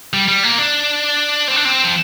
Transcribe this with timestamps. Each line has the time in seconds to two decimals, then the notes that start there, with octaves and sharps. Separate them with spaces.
0.13 G3
0.28 G3
0.44 A#3
0.58 D4
1.48 C4
1.56 D4
1.65 C4
1.84 F3